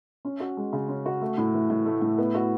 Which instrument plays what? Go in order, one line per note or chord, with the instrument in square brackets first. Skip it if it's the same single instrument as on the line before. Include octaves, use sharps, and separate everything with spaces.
[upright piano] C#4
F#4
G#3
C#3
C#4
F#4
A3
A2
E3
A2
A3
A2
B3
F#4